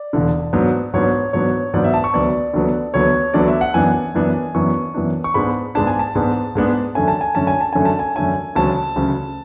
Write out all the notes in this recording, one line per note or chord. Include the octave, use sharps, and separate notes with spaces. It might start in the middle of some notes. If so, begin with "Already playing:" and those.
Already playing: D5
E1 E2 D3
G#2 F#3 B3 D4
G#2 F#3 B3 D4 C#5
G#2 F#3 B3 D4 C#5
G#2 F#3 B3 D4 D5
E5
A5
C#6
D2 D3 F#3 B3 D5
D2 D3 F#3 B3
D2 D3 F#3 B3 C#5
D2 D3 F#3 B3 D5
E5
F#5
F#2 E3 B3 D4 G#5
F#2 E3 B3 D4
F#2 E3 B3 D4 C#6
F#2 E3 B3 D4
C#6
G#2 G#3 B3 D4 B5
G#2 G#3 B3 D4 A5
G#5
A5
G#2 G#3 B3 D4
G#2 G#3 B3 D4
F#2 D3 A3 C#4 G#5
A5
G#5
F#2 D3 A3 C#4 A5
G#5
A5
F#2 D3 A3 C#4 G#5
A5
G#5
F#2 D3 A3 C#4 G#5
D2 C#3 F#3 C#4 A5
D2 C#3 F#3 C#4